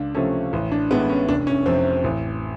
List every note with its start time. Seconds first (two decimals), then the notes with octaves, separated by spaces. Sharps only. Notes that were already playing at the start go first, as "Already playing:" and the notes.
Already playing: C#2 D4
0.15 C3 F3 A3 C#4
0.53 A1
0.72 D4
0.90 A2 E3 G#3 B3
1.10 C#4
1.28 F1 D4
1.47 C#4
1.66 F2 C3 C4
2.04 A1